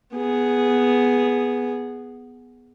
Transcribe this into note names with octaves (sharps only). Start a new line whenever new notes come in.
B3 G#4